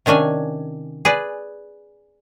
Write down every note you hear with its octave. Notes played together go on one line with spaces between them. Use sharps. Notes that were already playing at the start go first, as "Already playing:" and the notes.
C3 D#3 C#4 D4 G#5
G#4 B4 D5